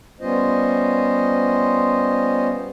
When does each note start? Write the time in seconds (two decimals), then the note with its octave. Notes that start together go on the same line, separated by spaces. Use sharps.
0.21 G3 B3 C#4 F4 C5 D#5